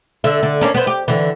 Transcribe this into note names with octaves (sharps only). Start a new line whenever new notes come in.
D3 E5
D3
A#3 C#4 D4
B3 C4
G4
D3 E3